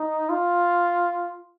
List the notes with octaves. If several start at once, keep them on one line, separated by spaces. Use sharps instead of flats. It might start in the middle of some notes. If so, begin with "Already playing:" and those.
Already playing: D#4
F4